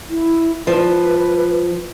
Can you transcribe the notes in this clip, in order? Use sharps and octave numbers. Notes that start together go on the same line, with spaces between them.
E4
F3 B4